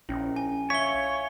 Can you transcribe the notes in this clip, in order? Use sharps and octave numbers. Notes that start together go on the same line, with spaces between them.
A#1 C#4 E4
G#5
C#5 E5 F5 B6 G7